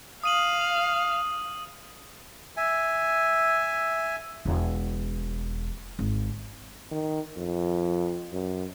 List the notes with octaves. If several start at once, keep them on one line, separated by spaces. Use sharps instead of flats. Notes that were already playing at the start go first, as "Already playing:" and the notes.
F5 D#6 D#7 F#7
E5 G#5
E1
G#1
D#3
F2
F#2